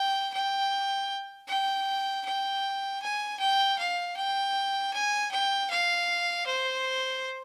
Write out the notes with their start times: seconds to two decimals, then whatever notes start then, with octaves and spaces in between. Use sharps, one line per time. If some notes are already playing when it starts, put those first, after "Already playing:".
Already playing: G5
0.33 G5
1.48 G5
2.25 G5
3.02 G#5
3.39 G5
3.78 F5
4.17 G5
4.93 G#5
5.31 G5
5.70 F5
6.46 C5